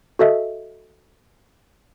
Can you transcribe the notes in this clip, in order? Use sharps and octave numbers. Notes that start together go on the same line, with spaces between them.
F#4 A4 D#5 E5